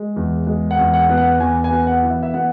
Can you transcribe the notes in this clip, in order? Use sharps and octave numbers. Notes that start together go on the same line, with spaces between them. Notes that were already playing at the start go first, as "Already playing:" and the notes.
Already playing: G#3
E2
G#3
F#5
E2
F#5
B3
F#5
E2 G#5
G#5
B3
F#5
E3
E5
E5
B3 F#5